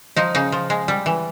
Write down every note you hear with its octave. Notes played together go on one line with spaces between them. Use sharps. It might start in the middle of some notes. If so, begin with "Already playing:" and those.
F3 D#4
C#3 D#4
F3
G#3
G3
E3